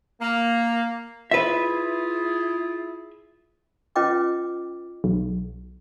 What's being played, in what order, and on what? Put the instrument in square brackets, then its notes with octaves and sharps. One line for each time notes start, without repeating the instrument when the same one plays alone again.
[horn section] A#3
[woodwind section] E4 F4 G#4 [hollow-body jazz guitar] B4 E5
[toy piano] C#4 F4 B4 D#5 G5 D6
[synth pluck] B1